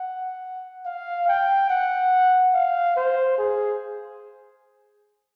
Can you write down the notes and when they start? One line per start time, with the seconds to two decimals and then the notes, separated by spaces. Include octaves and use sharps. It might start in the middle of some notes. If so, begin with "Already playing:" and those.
Already playing: F#5
0.85 F5
1.28 G5
1.70 F#5
2.54 F5
2.96 C5
3.38 G#4